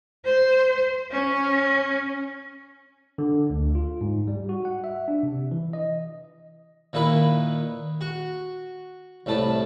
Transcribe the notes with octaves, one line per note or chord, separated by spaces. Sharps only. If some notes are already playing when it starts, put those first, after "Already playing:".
C5
C#4
D3
D2
F4
G#2
G3
F#4
F#5
E5
D4
C3
E3
D#5
A#2 D#3 E4 B4 B5
F#4
C2 A2 A5 B5